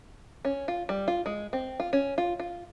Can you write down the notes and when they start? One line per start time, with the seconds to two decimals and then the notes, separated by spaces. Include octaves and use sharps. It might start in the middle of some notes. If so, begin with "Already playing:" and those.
0.45 C#4
0.68 F4
0.89 G3
1.08 F4
1.26 G#3
1.53 C4
1.80 F4
1.93 C#4
2.18 F4
2.39 F4